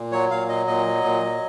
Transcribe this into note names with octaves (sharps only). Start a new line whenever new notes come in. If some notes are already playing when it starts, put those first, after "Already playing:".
Already playing: A#2
F#3 C#5
A#2 F5
F#3 D#5
A#2 D#5
F#3
A#2
F#3